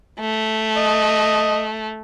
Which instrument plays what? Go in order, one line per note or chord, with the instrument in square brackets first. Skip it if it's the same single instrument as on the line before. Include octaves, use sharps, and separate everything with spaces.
[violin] A3
[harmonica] D#5